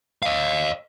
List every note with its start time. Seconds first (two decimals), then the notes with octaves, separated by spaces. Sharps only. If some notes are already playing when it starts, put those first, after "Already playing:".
0.22 D#5 F5